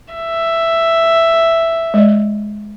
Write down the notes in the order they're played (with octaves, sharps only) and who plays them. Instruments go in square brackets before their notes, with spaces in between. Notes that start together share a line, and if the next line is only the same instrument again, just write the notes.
[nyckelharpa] E5
[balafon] G#3 D5